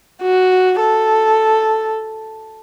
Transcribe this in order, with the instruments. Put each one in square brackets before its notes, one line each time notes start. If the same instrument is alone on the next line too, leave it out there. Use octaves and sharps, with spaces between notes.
[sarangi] F#4
A4